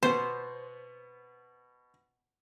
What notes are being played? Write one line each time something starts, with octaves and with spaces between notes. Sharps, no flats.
B2 B3 C5